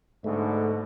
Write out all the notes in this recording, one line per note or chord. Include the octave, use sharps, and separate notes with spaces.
G#2 B2 D3 A3